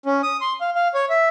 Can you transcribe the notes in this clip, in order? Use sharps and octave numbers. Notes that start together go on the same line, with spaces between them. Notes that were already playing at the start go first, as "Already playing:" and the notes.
C#4
D#6
C6
F5
F5
C#5
E5